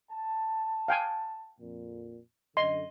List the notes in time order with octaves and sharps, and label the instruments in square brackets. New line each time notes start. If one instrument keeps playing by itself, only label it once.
[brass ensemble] A5
[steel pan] F5 G5 G#5
[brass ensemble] F2 A#2
[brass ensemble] F#2 D3 [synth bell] D#5 [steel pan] C6